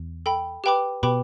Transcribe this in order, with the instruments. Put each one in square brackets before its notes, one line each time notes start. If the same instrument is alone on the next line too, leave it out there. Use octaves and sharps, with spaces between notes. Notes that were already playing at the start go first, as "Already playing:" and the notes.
Already playing: [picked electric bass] E2
[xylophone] A4 G5 B5
G4 B4 G5 B5 D6
[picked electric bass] B2 [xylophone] G4 B4 G5 B5 D6